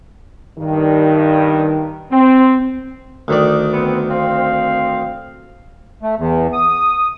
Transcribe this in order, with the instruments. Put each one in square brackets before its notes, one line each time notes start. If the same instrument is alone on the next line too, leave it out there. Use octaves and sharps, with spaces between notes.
[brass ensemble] G2 D#3
C4
[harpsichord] D2 D#3 D5
[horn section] B3 C4
C4 F5
[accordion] A3
E2
D#6